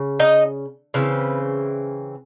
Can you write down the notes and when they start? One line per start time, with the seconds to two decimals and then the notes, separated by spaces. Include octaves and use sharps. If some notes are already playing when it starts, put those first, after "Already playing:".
Already playing: C#3
0.20 D#4 D#5
0.94 C#3 E3 C4 B4